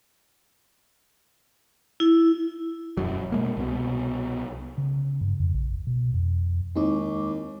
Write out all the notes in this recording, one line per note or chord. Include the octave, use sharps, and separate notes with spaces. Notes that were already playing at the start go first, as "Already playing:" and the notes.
E4
E1 C#2 F#2 F#3
B2 G#3 A#3
C2 B2
C#3
G2
F2
A#1
B2
F2
D#2 G#3 C4 D#4 E4 C#6 D6